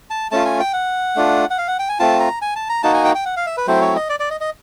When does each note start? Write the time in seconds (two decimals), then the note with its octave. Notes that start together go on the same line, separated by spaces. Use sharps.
0.10 A5
0.31 A3 C#4 F4 A5
0.45 G#5
0.60 G5
0.73 F#5
1.16 A3 D4 F4
1.50 F#5
1.58 F5
1.68 F#5
1.79 G5
1.89 G#5
1.99 A3 C4 F4 A5
2.20 A#5
2.41 G#5
2.56 A5
2.69 A#5
2.83 A#3 D#4 F#4 A5
2.94 G#5
3.05 G5
3.15 G5
3.25 F#5
3.37 F5
3.47 E5
3.57 B4
3.67 F#3 A3 C4 E4 C5
3.81 C#5
3.96 D#5
4.09 D5
4.20 D5
4.30 D#5
4.41 D#5